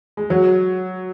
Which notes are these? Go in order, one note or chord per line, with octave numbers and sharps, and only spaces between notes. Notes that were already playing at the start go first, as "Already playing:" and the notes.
G#3
F#3